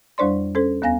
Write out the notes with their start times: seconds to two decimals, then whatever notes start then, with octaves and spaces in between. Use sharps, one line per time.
0.18 F2 G3 D4 C5 D5 C6
0.55 C#4 A4 C5
0.82 D#2 B3 F5 G#5 A#6